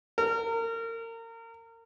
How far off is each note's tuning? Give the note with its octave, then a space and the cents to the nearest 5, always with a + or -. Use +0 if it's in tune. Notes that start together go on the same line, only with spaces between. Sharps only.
A#4 -30